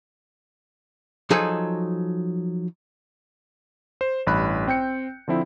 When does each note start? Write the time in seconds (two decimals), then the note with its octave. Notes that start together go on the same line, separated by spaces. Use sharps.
1.30 F3 F#3 D#4 G#4 A4
4.01 C5
4.27 A1 G2 B5 F#6
4.68 C4 G5 G6 C#7
5.28 D3 F3 C4 E4